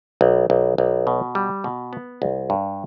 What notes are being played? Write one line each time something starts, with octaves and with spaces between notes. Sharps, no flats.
B1
B1
B1
B2
G3
B2
B3
C2
G2